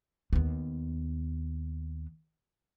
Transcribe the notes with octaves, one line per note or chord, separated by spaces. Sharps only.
D#2 B3